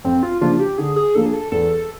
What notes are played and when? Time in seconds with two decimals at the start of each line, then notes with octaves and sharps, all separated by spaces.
0.04 F2 C4
0.23 F4
0.41 C#3 F3 A#3 D4 F4
0.60 G4
0.78 D3 G#4
0.96 G#4
1.15 F3 A#3 D4 A4
1.26 G#4
1.34 A4
1.52 E2 A4